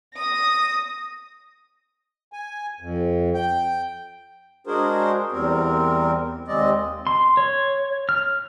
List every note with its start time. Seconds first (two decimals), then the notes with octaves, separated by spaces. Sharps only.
0.15 D#6 A#6
2.33 G#5
2.80 F2
3.34 G5
4.66 G#3 D4 F#4 G#4 A#4 C5
5.32 E2 G3 C4 A#4
6.48 D#2 C3 G#3 C4 D5 D#5
7.07 C6
7.37 C#5
8.09 F6